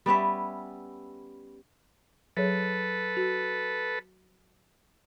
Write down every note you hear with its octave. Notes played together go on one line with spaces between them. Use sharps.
G3 B3 C#4 E5
F#3 G#4 A4 B4 C#5
F#4